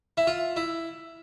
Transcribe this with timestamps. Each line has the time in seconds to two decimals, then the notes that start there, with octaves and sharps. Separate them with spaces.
0.17 E4
0.27 F4
0.56 E4